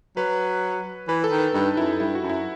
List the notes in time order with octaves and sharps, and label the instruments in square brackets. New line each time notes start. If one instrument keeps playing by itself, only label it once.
[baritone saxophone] F#3 [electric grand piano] B4
[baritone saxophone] E3 [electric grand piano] B4
[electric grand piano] A4
[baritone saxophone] D#3
[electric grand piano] B4
[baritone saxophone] G2 [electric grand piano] D#4
[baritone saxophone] F#2 [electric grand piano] E4
[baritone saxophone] G2 [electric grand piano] E4
[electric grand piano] F#4
[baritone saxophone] F#2
[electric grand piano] E4